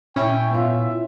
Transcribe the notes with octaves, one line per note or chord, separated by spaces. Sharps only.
A#2 C#4 E4 G5
B3 F4 E5